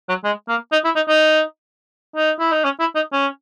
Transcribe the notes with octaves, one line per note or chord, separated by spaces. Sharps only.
F#3
G#3
A#3
D#4
E4
D#4
D#4
D#4
E4
D#4
C#4
E4
D#4
C#4